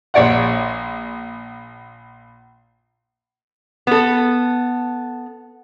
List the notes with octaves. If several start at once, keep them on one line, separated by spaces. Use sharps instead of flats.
A#1 C#5 D5 F#5
B3 A4